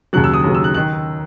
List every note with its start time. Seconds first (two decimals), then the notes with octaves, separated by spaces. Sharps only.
0.13 D#2 C#3 F#3 F#6
0.24 E6
0.34 D#6
0.44 D#2 C#3 F#3
0.55 E6
0.64 F#6
0.74 D#3 F#6